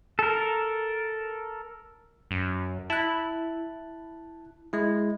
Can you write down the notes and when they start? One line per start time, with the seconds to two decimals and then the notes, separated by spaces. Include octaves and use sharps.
0.19 A4 A#4
2.31 F#2
2.90 E4 A5 F#6
4.73 G#3 E4